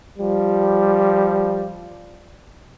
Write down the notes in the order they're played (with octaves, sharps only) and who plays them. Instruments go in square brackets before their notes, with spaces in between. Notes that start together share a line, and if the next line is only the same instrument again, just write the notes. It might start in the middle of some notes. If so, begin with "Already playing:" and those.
[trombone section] F3 G3